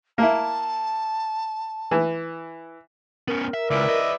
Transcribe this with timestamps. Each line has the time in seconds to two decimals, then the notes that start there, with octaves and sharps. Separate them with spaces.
0.18 A#3 E4 A5
1.91 E3
3.28 B3 C#4 A#4
3.54 E5
3.70 C#2 B4 D5 E5
3.89 D#5